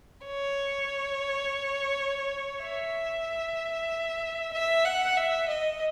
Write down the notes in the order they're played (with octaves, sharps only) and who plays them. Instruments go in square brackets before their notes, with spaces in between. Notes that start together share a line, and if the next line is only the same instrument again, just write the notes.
[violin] C#5
E5
E5
F#5
E5
D#5